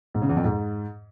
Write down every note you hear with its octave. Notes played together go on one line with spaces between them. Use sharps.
G#2
C#3
E2
F2
G#2